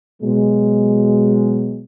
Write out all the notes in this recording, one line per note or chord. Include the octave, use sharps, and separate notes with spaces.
B2 F#3 G#3